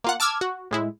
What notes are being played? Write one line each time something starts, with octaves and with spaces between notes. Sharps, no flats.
A#3 F4 F#5
A5 D6 E6 F6 G#6
F#4
A2 G#3 E4